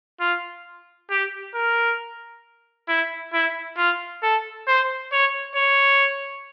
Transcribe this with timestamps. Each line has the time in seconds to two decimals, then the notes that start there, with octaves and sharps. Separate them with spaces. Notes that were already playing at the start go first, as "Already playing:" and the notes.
0.20 F4
1.10 G4
1.55 A#4
2.88 E4
3.33 E4
3.77 F4
4.23 A4
4.67 C5
5.12 C#5
5.55 C#5